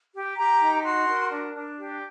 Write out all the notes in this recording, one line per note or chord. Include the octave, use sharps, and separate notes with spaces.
G4
G4 A#5
D#4
F#4 C6
A#4
D4
D4
G4